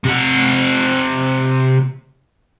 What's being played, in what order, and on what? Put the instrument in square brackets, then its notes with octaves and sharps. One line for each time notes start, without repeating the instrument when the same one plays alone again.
[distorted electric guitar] C3 F#5